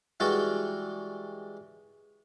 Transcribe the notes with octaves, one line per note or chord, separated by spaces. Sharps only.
E3 G3 G#3 F#4 G5 A5